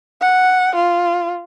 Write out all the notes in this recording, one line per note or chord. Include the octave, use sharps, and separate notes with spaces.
F#5
F4